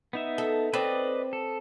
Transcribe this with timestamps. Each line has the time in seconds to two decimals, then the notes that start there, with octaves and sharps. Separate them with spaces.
0.13 B3 D#4 E5
0.38 A4
0.74 C4 B4 D5 D#5
1.33 A4